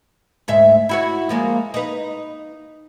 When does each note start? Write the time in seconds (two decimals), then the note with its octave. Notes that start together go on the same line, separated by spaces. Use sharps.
0.48 D2 G#2 E5
0.89 E4 F#4 C#5
1.29 F3 G#3 A#3
1.74 D#4 B4